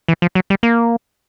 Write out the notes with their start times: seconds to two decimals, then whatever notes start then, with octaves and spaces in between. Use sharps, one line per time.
0.08 E3
0.22 F3
0.35 F#3
0.50 G3
0.63 A#3